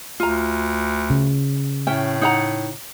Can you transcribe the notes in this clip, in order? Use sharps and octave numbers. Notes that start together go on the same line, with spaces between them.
D2 F4 A#5
C#3
A2 C#4 E5 G5
D#4 F#5 A#5